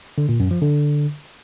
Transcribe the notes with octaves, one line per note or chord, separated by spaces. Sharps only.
D3
A#2
F#2
F3
D3